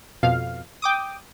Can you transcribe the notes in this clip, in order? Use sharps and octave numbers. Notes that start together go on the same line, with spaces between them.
F2 B2 F5
G5 D6 D#6